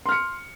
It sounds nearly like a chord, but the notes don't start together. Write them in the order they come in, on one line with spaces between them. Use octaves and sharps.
C6 F6 C#7